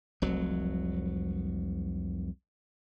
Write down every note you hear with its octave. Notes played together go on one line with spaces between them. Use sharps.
F1 C2 F#3